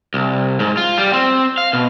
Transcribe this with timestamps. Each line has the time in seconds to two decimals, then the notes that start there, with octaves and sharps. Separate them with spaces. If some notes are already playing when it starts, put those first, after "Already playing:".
0.14 C2
0.60 G#2
0.77 F4
0.98 G3
1.13 C4
1.58 F5
1.73 B2